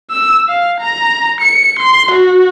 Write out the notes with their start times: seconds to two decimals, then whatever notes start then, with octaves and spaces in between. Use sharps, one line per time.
0.11 E6
0.48 F5
0.80 A#5
1.41 C#7
1.79 C6
2.11 F#4